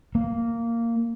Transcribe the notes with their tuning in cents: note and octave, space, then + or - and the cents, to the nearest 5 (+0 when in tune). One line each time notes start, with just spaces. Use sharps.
A#3 -10